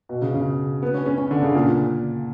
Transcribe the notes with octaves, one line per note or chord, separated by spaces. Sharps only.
B2
C#3
C#3
B3
C#4
C#4
C#4
D3
C#3
A#2